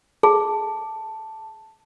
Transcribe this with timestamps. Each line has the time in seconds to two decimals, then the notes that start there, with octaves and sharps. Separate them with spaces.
0.23 G#4 A5